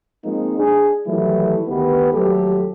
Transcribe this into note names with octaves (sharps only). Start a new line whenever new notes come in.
F3 G#3 A#3 C4 D#4
D4 G#4
D#3 E3 F#3 G3 A3 E4
D2 D#3 B3 G4 B4
D#2 F3 F#3 A3 G4 A4